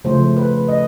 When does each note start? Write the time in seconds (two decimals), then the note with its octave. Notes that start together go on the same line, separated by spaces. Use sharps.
0.05 C#3 F3 A3 C5
0.36 B4
0.68 D#5